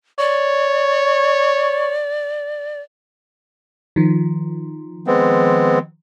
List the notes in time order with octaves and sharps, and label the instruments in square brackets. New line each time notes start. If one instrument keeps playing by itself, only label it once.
[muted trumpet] C#5 [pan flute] D5
[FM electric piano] D#3 F3
[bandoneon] G#3 B3 C4